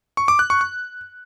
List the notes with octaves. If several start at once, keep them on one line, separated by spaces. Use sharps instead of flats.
C#6
D6
F#6
C#6
F#6